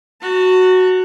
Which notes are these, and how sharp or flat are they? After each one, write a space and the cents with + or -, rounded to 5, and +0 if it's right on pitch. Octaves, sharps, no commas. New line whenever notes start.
F#4 +0 A5 +40